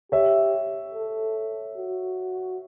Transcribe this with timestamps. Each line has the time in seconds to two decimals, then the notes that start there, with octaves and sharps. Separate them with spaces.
0.12 G4 C#5 E5
0.94 A4
1.77 F#4